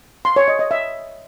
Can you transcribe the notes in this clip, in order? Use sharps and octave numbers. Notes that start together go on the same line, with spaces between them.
C6
C#5
D#5
D#5
E5